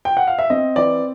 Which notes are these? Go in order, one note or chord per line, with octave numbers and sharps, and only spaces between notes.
G5
F#5
F5
E5
C4 D#5
E3 D5